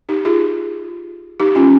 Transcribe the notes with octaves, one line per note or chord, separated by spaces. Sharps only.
D#4 G4
F4 G#4
D#4 G4
C#4 F4